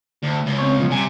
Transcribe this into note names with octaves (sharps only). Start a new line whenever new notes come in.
D2
C#2
C4 C#5
B2 F3
C2 C3 G#5